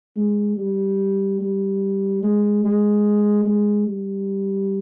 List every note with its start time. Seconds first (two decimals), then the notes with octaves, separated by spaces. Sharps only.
0.16 G#3
0.57 G3
1.41 G3
2.23 G#3
2.64 G#3
3.46 G#3
3.88 G3